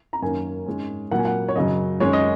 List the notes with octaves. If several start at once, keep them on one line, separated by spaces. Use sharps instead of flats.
A#5
F#2 D#3 A#3 C#4 G#5
G#2 G#3 C#4
A#2 F#3 A#3 F#5
G#5
F#5
C#5
F#2 C#3 F#3 D#5
F#2 D#3 G#3 C#4 C#5
D#5